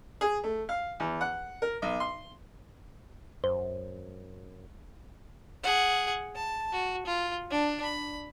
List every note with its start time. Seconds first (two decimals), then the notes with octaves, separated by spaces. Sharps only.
0.21 G#4
0.44 A3
0.69 F5
1.00 E2
1.21 F#5
1.62 A#4
1.82 B1
2.00 C6
3.44 F#2 C5
5.64 G#4 F#5
6.35 A5
6.72 F#4
7.06 F4
7.51 D4
7.82 B5